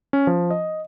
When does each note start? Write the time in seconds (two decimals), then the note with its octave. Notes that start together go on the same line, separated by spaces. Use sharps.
0.13 C#4
0.27 F3
0.51 D#5